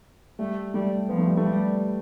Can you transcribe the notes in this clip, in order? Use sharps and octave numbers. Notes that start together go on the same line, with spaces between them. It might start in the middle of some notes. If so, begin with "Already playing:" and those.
G3 A3
G3 A3
F3 B3
A3
G3
A3
G3